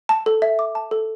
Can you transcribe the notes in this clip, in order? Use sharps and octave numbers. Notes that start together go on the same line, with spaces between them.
A5
A4
E5
D6
A5
A4